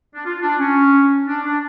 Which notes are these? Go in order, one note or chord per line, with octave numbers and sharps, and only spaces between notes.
D4
F4
D4
C#4
D4
D4